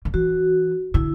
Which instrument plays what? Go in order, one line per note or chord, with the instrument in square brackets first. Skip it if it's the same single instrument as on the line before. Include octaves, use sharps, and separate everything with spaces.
[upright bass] D3
[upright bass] E3 [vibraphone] F#4
[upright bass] D3 [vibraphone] E4